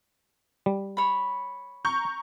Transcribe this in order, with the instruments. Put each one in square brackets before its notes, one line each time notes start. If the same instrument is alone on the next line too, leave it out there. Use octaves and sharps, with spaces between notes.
[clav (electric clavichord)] G3
[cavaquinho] C#5 B5
[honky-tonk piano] A#5 C#6 G6